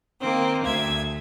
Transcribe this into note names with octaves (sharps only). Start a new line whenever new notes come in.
D#3 A#3 C4
D2 E5 G#6